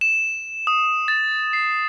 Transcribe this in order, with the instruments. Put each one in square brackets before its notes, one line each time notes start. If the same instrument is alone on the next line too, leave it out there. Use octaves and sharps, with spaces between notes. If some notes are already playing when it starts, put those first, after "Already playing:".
[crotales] E7
D#6
A6
C7